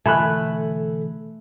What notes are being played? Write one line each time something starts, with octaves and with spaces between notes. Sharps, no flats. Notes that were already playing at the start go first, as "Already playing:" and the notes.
B2 D3 E3 A3 A4 G#5 B5 F#6